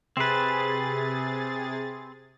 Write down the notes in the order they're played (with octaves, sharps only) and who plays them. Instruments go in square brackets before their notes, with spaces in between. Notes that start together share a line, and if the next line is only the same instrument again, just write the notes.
[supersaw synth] C3 G#4 A6 [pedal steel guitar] C4 B4